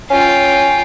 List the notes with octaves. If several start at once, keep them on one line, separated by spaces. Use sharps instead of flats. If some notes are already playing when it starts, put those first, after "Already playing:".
C#4 F4 G5